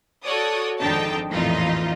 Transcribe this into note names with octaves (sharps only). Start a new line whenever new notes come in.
F#4 A4 C#5 D5 D#6
G#1 F2 D3 D#4 G5 A5
A1 F2 A#2 E3 D#4 F4